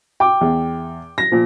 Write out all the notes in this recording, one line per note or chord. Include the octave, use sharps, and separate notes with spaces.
G5 D6
E2
A#6
A#2 F3